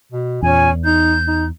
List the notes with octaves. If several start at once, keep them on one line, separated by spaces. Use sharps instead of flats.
B2
E2 A#2 C#4 G#5
D#4 G6
D#4